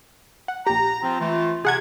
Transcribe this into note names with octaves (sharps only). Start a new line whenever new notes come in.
F#5
A#1 G4 A#5
F3 C4 F4
E3 A3 F4
C3 G#4 F#5 G#6